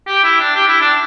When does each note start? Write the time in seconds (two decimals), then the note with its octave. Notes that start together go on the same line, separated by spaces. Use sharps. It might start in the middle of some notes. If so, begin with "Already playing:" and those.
0.07 G4
0.24 E4
0.40 D4
0.56 G4
0.68 E4
0.81 D4